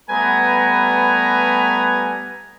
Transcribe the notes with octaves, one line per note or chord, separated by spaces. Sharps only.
G3 A3 B3 B4 G#5 A#5